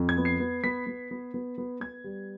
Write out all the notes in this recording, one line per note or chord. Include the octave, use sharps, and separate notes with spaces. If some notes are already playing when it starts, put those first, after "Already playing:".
Already playing: F2
G#6
B3
C7
B3
B3 B6
B3
B3
B3
B3
B3 G#6
G3